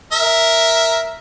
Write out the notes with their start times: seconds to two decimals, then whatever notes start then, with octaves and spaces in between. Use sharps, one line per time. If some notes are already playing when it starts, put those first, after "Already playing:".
0.12 A#4 E5